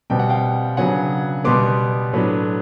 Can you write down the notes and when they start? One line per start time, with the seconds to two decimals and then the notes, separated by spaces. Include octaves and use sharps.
0.10 B2 G3 C4 G5
0.19 F#5
0.29 F5 G5
0.77 C#3 F#3 B3 D4 F#5 G#5
1.44 B2 G3 B3 C6 D6
2.13 A2 F#3 B3 D4